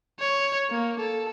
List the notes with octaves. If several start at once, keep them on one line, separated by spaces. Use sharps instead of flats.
C#5
A#3
A4